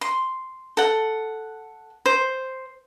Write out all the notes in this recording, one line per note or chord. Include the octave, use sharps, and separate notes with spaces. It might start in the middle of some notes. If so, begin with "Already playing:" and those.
C6
A4 F#5
C5